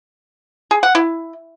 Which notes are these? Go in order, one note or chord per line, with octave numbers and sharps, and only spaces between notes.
G#4
F#5
E4